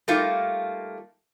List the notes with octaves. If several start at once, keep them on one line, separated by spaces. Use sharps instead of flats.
G3 A3 A#3 D#4 F4